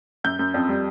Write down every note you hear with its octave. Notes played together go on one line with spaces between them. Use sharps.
F#2 G6
F#2
F2
G3